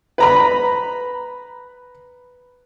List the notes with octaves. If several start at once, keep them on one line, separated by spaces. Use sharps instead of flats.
B4 A#5 B5